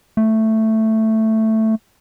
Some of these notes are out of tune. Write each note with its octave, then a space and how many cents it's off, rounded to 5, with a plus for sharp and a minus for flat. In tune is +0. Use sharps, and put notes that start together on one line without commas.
A3 +5